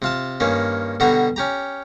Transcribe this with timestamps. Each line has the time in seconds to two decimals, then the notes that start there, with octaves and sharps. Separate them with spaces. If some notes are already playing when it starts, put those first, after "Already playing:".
0.02 C3 F4 A5
0.40 G2 D#3 A#3 C#4
1.00 B2 D3 G3 F#4 A#5
1.36 C#4 G4 A#5